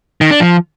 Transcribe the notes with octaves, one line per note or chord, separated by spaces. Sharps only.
D#3
D4
F3